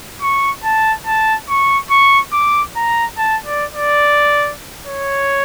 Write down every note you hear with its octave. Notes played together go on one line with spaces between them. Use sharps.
C#6
A5
A5
C#6
C#6
D6
A#5
A5
D5
D5
C#5